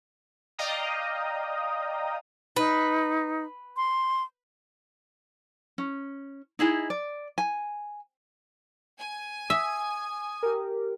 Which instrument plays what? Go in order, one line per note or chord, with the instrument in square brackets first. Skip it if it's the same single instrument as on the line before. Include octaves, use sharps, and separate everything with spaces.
[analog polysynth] D5 D#5 F5 G5 A#5 D#6
[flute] D#4 [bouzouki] B4
[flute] C6
[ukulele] C#4
D#4 E4 G#4 D#5
D5
G#5
[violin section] G#5
[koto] E5 [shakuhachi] D#6
[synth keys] G4 A#4